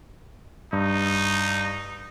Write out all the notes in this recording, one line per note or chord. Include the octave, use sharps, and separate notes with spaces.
G2 D#4